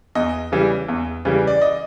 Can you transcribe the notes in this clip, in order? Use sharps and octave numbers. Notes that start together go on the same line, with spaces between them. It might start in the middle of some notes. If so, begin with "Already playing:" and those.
E2 D#5
C#3 E3 G3
E2
C#3 E3 G3
D5
D#5